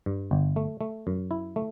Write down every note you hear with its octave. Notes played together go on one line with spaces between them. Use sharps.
G2
G1
A3
A3
F#2
E4
A3